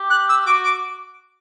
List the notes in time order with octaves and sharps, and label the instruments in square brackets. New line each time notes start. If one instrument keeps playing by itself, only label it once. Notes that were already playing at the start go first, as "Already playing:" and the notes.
Already playing: [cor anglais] G4
[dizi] F#6
E6
[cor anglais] F#4 [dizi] D6
[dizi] D6